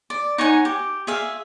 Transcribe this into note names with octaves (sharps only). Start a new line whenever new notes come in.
D5
D#4 C#5 F#5 G#5
G4
G#4 E5 F5